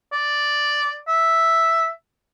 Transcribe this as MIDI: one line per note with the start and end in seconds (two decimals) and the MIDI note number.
0.13 0.96 74
1.08 1.89 76